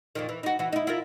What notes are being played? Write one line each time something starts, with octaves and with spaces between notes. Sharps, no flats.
F2 A#2 D#3
E3
D#4 F#4
E3 F#4
D#4 E4
E4 F4 A#4